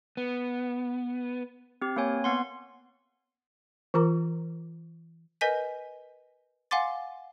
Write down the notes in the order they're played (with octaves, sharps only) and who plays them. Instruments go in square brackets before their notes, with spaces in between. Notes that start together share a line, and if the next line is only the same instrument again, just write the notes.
[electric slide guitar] B3
[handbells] C4 G4
A#3 C4 C#5 G#5
B3 F#5 C6
[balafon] E3 F4 A#4 A#5 D6
[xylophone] A#4 B4 D#5 G#5 G6 B6
F5 F#5 G#5 C6 D6 A6